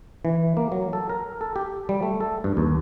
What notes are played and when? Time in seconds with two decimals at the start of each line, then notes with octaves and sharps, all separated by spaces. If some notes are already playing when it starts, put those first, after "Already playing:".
0.25 E3
0.57 A#3
0.72 F#3
0.93 A4
1.10 A#4
1.41 A4
1.56 G4
1.89 G3
2.03 A3
2.21 A4
2.44 G2
2.57 D#2